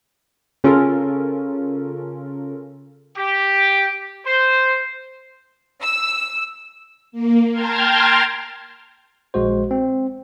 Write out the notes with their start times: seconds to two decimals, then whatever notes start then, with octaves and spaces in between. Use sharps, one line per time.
0.64 C#3 C#4 F4 A4 A#4
3.17 G4
4.27 C5
5.83 E6
7.12 A#3
7.51 G5 A5 A#5 C6 F6 G#6
9.34 A#1 G#3 F#4 C5
9.71 C4